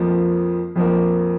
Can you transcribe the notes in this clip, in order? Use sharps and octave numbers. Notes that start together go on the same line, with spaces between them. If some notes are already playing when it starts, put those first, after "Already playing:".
Already playing: F2 F3 A#3
F2 F3 A#3